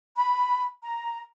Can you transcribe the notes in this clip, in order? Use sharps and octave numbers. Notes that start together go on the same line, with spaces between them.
B5
A#5